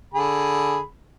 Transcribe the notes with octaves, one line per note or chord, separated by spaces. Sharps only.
D3 G#4 B5